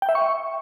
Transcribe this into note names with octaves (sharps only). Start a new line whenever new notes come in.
G5
E5
C#6